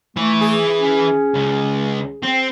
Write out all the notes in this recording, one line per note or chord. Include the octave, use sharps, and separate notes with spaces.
E3 A3 E4
G#4
C#4
C#2
C4